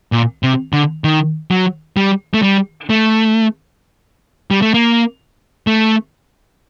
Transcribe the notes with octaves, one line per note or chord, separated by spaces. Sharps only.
A#2
C3
D3
D#3
F#3
G3
A3
G3
A3
G3
A3
A#3
A3